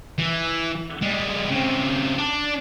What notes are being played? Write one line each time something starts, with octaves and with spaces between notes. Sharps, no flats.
E3
G3 G#3
C#3 C4
D4